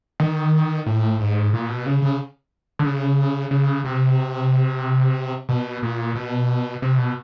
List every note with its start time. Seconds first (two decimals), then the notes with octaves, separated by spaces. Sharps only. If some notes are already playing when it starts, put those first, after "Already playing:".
0.20 D#3
0.86 A2
1.20 G#2
1.53 A#2
1.69 B2
1.86 C#3
2.02 C#3
2.79 D3
2.85 C#3
3.51 C#3
3.84 C3
5.49 B2
5.83 A#2
6.15 B2
6.82 C3
6.98 B2